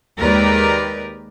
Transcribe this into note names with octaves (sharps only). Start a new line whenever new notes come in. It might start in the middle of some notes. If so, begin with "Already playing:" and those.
D#2 G#3 G4 A#4 B4 D5